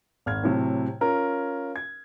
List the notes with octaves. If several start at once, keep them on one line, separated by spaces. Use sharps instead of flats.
G#1 F6 G#6
A2 C3 F#3
C#4 F4 A#4
G#6